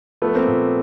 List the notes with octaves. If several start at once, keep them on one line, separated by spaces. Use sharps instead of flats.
F3 A3 B3
A#3 C4
A#2